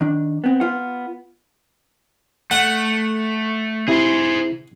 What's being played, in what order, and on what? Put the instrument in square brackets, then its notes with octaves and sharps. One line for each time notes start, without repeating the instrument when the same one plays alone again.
[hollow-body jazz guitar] D#3 D4
B3 C4
B3 F4 F#5
[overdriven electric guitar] A3 [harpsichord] F#5
[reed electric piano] C3 E4 [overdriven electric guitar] G#4 C5